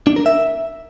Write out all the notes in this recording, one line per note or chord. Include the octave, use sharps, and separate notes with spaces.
D4
A#4
E5